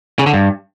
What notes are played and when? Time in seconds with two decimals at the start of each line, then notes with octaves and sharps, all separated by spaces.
0.19 C#3
0.26 D3
0.34 G2